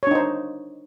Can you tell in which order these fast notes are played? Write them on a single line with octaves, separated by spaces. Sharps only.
C#5 D4 D#4 C5